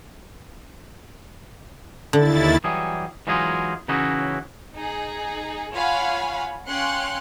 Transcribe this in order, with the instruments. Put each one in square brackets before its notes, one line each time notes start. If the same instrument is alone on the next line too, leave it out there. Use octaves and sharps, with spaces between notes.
[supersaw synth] D#2 E4 A6 [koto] D3
[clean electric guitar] E3 F#3 G3 G#4
E3 F#3 G#3 D#4 F4 G#4
C#3 E3 C#4 D#4 E4 F#4
[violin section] D#4 G#4
F4 C#5 F5 F#5 G#5 B5
C#4 F5 G5 C6 F#6 C#7